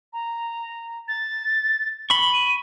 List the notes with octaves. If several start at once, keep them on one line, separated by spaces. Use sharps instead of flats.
A#5
A6
B5 C#6 G7
D#7